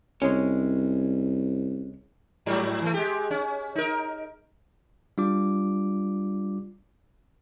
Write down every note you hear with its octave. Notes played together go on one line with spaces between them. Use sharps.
C2 G#3 C#4
G#2 F#3 G3
E3 A3
G#3 G4
C#4
D#4 A#4
G3 D4 F4 D6